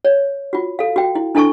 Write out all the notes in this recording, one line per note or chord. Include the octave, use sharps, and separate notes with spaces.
C#5
F4 F#4
A4 F5
F#4 G5
E4
D4 E4 A4 A5 C#6